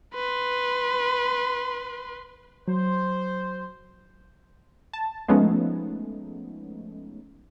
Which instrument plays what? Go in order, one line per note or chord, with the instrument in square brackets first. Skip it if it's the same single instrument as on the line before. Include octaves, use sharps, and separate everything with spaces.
[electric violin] B4 C6
[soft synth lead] F#3 [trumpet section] C5
[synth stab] A5
F3 G#3 A3 B3 C#4 D#4